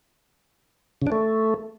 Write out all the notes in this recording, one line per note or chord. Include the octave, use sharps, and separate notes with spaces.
C#3
D4
A3